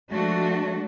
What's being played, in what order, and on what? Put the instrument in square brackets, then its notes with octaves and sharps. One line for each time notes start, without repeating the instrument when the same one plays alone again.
[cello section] F3 G#3 A3 D4 F#4